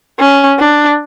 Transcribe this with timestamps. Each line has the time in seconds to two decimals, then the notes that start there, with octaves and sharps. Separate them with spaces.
0.19 C#4
0.59 D4